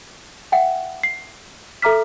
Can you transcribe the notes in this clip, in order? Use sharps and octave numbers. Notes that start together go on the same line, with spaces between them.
E5 F#5 G5
C7
A4 E5 A#5 D6 F6 B6